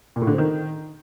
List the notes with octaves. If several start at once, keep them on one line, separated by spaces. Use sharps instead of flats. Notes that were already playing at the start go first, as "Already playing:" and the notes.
A#2
A2
D3
C4
D#3